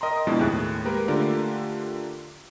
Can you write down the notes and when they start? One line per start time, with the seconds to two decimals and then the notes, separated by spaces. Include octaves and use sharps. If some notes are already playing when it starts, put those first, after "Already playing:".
0.01 A#4 D#5 G5 A#5 C6
0.27 F2 B2 G#3 D4 E4
0.39 D#2 A2 G#4 F#6
0.84 G#3 A#3 G4 A#4 B4
1.08 D3 A3 D4 F4 G4 A#4